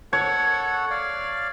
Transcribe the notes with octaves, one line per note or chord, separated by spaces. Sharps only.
A4 C#5 F#5
D5 F5